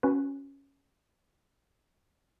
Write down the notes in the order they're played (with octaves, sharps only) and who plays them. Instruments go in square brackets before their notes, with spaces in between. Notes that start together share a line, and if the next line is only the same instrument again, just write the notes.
[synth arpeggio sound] C#4 F#4 B4